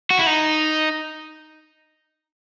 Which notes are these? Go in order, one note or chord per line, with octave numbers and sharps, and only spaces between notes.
F#4
E4
D#4